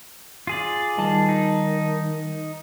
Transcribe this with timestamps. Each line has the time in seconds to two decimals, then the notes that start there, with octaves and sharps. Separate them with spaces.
0.47 F4 G#4 D5
0.98 D#3 G3 D#5 A5
1.29 D#4